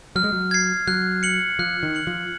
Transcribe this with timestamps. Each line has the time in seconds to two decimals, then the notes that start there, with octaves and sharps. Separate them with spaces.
0.16 F#3 F6
0.24 G#3
0.33 F#3
0.51 G#6 C7
0.87 F#3 F#6
1.23 C#7 F#7
1.59 F3 F#6
1.83 D#3
1.95 C#7 F#7
2.07 F3